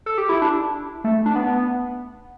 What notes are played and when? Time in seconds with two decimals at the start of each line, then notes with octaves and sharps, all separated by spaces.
0.06 A4
0.18 G4
0.29 E4
0.42 D4
1.04 A3
1.26 D4
1.35 B3